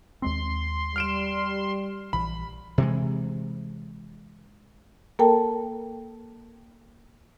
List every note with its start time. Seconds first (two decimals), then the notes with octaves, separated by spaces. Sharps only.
0.22 D#2 G#3 C4 C6
0.96 G3 F6 D7 E7
2.13 A#1 E3 B5
2.78 C3 E3 G#3
5.19 A#3 A4 A#4 G5 A5